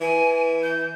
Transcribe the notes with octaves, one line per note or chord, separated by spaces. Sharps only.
E3 G#5
G6